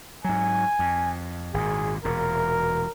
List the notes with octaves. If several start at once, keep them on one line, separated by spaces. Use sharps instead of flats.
G#2 F#3 G#5
F2
G#1 A#2 G#4
E1 A#2 A#4